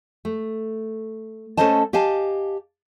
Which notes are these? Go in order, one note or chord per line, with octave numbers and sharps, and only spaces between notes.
A3
A3 C#4 A4 C5 D#5 A5
G4 D#5 F5 G#5 A5